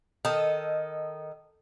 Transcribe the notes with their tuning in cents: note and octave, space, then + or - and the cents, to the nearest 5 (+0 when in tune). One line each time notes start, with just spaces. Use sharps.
D#3 +0 A4 +5 D#5 -10